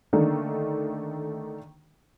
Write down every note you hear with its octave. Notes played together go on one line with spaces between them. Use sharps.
D3 D#3 A3 A#3 D4 D#4